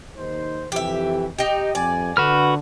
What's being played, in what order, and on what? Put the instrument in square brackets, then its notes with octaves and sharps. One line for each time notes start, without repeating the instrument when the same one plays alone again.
[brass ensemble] D#2 D#4 C5
[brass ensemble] F2 C3 E3 [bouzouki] G4 E5
[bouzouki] D#4 G4 [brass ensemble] D#5
[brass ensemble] F2 G#5 [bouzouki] D5
[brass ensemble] D3 [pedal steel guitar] F#4 B4 F6